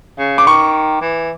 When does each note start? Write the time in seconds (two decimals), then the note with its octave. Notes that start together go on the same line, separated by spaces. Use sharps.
0.19 C#3
0.38 D6
0.47 D#3 C#6
1.02 E3